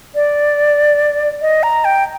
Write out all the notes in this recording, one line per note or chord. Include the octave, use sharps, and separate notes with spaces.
D5
D#5
A#5
G5